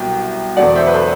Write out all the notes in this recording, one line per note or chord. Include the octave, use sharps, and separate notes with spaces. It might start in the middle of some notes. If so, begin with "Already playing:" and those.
Already playing: C2 B2 F#3 G5
E1 E2 D3 F#3 D5 F#5
C5 E5
B4
A4 C5